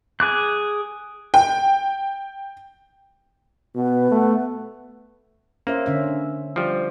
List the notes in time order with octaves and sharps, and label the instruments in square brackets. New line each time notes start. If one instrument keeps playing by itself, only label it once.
[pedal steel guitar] G#4 D6 F#6
[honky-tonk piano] G5
[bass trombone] B2 [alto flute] B3
[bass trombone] A3
[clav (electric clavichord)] A#3 [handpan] C#4 C5 E5
[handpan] D3 C#4 E5
[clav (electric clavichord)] F3 G3